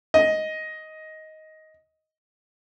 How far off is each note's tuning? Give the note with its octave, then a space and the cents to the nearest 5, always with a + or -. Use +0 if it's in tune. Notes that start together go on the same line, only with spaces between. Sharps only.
D#5 +10